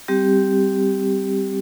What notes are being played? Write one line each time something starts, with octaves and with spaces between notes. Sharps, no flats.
G3 C4 G4